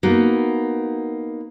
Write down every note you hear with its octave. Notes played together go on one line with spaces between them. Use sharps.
A#3 B3 D#4 F#4